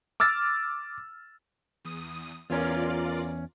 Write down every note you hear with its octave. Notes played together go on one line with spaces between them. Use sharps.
D6 E6 F6 A6
E2 D#6
E2 C#4 F4 A#4 D5